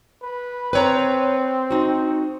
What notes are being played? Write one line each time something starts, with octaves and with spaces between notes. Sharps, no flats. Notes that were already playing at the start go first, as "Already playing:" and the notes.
B4
C4 B4 C#5 A#5
D#4 F#4